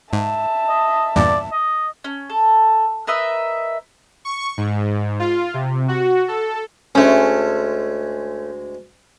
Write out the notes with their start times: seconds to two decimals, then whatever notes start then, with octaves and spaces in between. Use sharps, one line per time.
0.13 G#2 E5 A5
0.69 D#5
1.16 E2 G2 A#2 D5
1.52 D#5
2.04 C#4
2.30 A4
3.07 A#4 B4 D#5 E5
4.25 C#6
4.57 G#2
5.20 F4
5.54 C3
5.88 F#4
6.28 A4
6.95 D2 G#3 A3 C#4